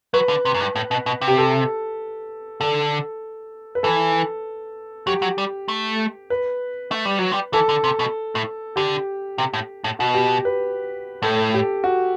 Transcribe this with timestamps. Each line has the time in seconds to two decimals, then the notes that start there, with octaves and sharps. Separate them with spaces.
0.14 F#3 B4
0.29 D3
0.45 C3
0.54 F#2
0.61 G2
0.76 A2
0.91 B2
1.06 B2
1.21 C3
1.28 G4
1.38 A4
2.60 D3 A4
3.75 B4
3.83 E3 A4
5.07 F#3 G4
5.22 F#3
5.38 G3
5.68 A3
6.30 B4
6.91 A3
7.05 G3
7.19 F#3
7.32 G3
7.53 E3 A4
7.69 D3
7.84 C3
7.99 B2
8.35 A2
8.76 D3 G4
9.38 C3
9.54 A2
9.84 A2
9.99 B2 F#4
10.14 G4
10.45 B4
11.22 A2 A4
11.54 G4
11.84 F#4